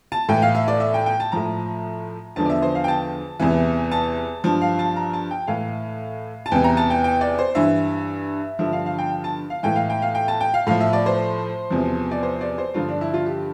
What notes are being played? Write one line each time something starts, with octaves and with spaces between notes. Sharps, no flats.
A5
A2 E3 G5
F5
E5
D5
E5
G5
G5
A5
A2 F3 A#5
E2 D3 F3 A5
D5
E5
C5
F5
G5
A5
E2 C3 E3
A5
G2 F3 A5
F5
A5
A#5
A5
G5
A2 E3 F5
A5
E2 C3 E3 G5
A#5
A5
G5
G5
D5
C5
G2 E3 E5
G2 D3 F3 E5
F5
F5
G5
A5
F5
A2 E3 G5
F5
G5
F5
G5
A5
G5
F5
A2 F3 F5
E5
D5
C5
E2 C3 F3
D5
C5
D5
C5
G2 D3 F3 F4
D4
E4
F4
G4